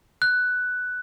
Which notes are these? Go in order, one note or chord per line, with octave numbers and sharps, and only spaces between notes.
F#6